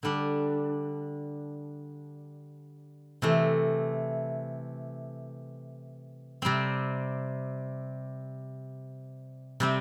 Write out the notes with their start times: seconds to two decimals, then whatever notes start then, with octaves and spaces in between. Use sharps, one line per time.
0.03 D3 G3 D4
3.22 C3 E3 A3
6.42 C3 G3 C4
9.60 C3 G3 C4